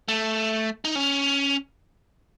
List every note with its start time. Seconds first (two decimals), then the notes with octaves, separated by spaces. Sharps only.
0.08 A3
0.85 D#4
0.95 C#4